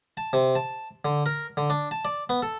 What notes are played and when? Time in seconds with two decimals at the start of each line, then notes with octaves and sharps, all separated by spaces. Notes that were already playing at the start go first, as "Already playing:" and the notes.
0.17 A5
0.33 C3
0.55 A5
1.05 D3
1.26 A#4
1.57 D3
1.70 D4
1.91 A5
2.05 D5
2.29 B3
2.42 A4